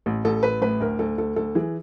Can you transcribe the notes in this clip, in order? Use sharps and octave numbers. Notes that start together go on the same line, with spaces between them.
A1
A1 A4
A1 B4
A2 B4
D2 A#4
D2 A4
D2 A4
D2 A4
E3 G#4